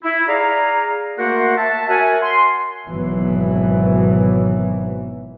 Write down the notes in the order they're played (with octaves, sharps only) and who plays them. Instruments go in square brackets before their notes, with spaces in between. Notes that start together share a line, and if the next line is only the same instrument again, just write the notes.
[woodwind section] E4
G#4 D5 F5 A#5
A3 A#3 F#4 A#4 C5 F#5
E5 A5
F#4 A#4 C#5 E5 F#5 G#5
C6
[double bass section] G#1 G#2 B2 E3 F#3 B3